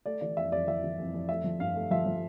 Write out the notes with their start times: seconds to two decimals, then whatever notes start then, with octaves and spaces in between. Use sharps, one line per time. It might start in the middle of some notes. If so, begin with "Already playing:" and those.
0.06 A3 D5
0.21 E3 D5
0.37 F2 E5
0.52 F2 D5
0.67 E3 E5
0.84 E3
0.99 F2
1.14 F2
1.29 A3 E5
1.44 F3
1.60 G2 F5
1.75 A3
1.91 F3 E5
2.06 F3